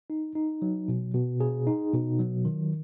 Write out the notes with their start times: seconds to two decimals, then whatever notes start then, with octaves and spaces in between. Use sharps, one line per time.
0.10 D#4
0.35 D#4
0.62 F#3
0.88 B2
1.15 B2
1.40 G#4
1.67 D#4
1.93 B2
2.19 F#3
2.45 D#3